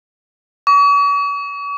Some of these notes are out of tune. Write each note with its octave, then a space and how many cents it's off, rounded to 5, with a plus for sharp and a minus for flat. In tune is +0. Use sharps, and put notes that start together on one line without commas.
C#6 +45